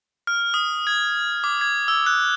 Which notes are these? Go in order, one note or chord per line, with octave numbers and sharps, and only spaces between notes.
F6
D#6
G#6
D6
G#6
E6
F#6